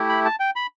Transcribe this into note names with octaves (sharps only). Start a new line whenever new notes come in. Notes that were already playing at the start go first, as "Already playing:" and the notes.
Already playing: A3 E4 G4
B5
A5
G5
B5